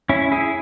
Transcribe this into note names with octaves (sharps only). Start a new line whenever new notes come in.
C#4 E4
E4 G#4